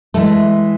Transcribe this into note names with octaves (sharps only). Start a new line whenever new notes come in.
E3 G#3 A3 A4